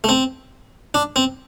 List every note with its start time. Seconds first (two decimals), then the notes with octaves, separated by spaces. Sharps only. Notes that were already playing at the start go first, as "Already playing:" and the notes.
0.04 A3
0.09 C4
0.94 D4
1.16 C4